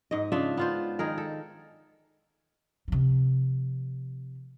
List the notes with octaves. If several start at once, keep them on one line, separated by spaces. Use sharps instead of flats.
G#2 D#5
C#3 D4 F4 E5
B3 F4 C5
D#3 G#4 A#4
A4
C3 F3